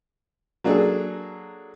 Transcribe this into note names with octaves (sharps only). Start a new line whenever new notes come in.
F#3 A#3 D4 G#4 A4